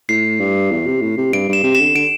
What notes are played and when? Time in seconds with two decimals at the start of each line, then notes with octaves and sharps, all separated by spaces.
0.09 A2 C7
0.40 G2
0.71 E2
0.86 C3
1.01 A2
1.17 C3
1.32 G2 D7
1.49 G2 E7
1.63 C3
1.75 D3 E7
1.95 D3 D7